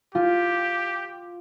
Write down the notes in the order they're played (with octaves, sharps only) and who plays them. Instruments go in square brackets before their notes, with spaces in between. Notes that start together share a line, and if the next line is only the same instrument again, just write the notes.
[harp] F4 [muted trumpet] G4